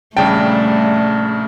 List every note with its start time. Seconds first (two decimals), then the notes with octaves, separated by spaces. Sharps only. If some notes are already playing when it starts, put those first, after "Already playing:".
0.17 A#1 C#3 G3 A3 G5 A5